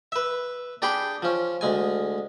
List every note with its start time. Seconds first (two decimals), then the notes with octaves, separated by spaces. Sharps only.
0.12 B4 E5
0.82 D4 G4 G#4 G5 B5
1.22 F3 C#4
1.61 D2 G#3 G#5